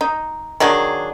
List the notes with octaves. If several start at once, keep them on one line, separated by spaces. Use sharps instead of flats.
D#4
D#3 F#3 D4 G#4